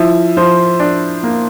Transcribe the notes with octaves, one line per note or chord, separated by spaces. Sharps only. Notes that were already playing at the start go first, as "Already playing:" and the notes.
Already playing: F3 E4
F3 C5
D4
A#3